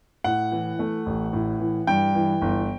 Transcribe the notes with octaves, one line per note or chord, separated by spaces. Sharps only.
A2 F#5
E3
A3
A1
A2
E3
G2 G5
E3
G1